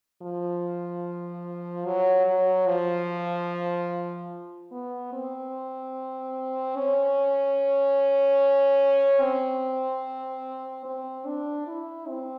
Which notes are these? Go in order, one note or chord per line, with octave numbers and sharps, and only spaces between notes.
F3
F#3
F#3
F3
B3
C4
C#4
C4
C4
D4
E4
C4